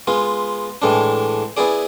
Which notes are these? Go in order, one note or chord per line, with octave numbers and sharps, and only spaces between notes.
G#3 B3 F4
A2 E3 G#3 D4
B3 E4 G#4 D5